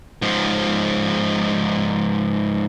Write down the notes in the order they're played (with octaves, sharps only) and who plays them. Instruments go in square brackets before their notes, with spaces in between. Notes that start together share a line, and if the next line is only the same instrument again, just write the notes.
[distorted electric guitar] G#2 F3